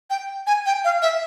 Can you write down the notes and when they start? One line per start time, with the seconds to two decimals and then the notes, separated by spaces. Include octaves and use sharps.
0.10 G5
0.47 G#5
0.66 G5
0.84 F5
1.02 E5